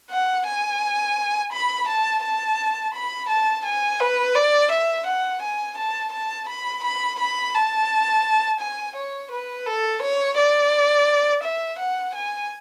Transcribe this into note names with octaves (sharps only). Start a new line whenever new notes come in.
F#5
G#5
B5
A5
A5
B5
A5
G#5
B4
D5
E5
F#5
G#5
A5
A5
B5
B5
B5
A5
G#5
C#5
B4
A4
C#5
D5
E5
F#5
G#5